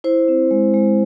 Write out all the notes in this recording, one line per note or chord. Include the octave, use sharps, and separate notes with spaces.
E4 C5
C4
G#3
G#3